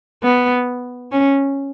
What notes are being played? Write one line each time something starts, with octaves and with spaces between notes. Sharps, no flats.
B3
C#4